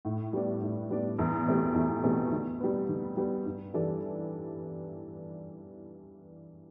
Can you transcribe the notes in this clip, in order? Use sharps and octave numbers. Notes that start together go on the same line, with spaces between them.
A2
G3 B3 D4
A2
G3 B3 D4
E2
B2 A3 C4 G4
E2
B2 A3 C4 G4
D3
G3 B3
D3
G3 B3
G2
E3 G3 D4 A4